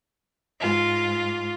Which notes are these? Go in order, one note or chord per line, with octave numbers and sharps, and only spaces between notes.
G#2 F4